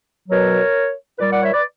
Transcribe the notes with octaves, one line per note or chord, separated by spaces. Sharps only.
B2 F#3 A#4 C#5
A#2 G3 B4 D5
D5 F#5
C#5 E5
B4 D5